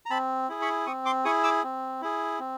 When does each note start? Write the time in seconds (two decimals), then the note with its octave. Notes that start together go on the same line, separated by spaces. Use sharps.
0.06 A#5
0.10 C4 A5 B5
0.49 E4 G#4
0.62 B5 C#6
0.86 C4 C#6 D#6
1.05 C6 D6
1.25 E4 G#4 C#6 D#6
1.44 D6 E6
1.63 C4
2.02 E4 G#4
2.39 C4